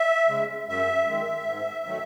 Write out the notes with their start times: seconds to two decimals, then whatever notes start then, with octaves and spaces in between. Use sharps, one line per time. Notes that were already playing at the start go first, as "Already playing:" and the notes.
Already playing: E5
0.29 C#3 G#3
0.68 F#2 E5
1.07 D#3 G#3
1.46 G#2
1.85 D#3 F#3 A3